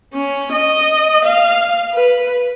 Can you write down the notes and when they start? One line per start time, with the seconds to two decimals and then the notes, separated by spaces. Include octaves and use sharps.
0.14 C#4
0.52 D#5
1.24 F5
1.94 B4